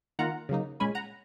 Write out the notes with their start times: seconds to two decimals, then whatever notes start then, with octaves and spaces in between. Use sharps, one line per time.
0.19 D#3 A#3 F4 F#5 A#5
0.49 C#3 F#3 A#3 D#4
0.80 A#2 G#3 C#4 G#5 B5
0.95 F#5 A#5